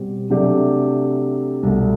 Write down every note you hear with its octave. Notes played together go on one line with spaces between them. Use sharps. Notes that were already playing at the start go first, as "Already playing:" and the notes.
Already playing: B2 G3 C4 G4
C3 F#3 A3 D4 G4
C2 B2 A3